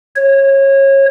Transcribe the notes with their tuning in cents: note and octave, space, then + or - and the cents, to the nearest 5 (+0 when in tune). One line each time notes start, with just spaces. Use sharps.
C#5 -25